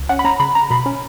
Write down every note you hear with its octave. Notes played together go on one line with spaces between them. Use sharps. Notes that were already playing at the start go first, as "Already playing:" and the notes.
Already playing: C#2
C#4 F#5
B5
C#4 A#5
C#3 B5
C#3 A#5
B2 B5
C#4